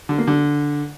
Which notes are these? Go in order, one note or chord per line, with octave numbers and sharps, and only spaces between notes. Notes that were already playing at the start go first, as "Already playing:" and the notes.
D3
A#3
D3